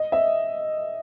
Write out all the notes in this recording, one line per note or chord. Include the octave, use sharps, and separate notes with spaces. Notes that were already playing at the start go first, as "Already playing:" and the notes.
Already playing: D#5
E5